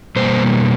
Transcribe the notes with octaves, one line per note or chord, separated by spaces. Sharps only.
B2 G3 A#3 C5